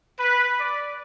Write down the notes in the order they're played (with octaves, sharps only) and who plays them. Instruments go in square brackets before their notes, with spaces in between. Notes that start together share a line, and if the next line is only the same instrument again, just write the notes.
[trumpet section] B4
D5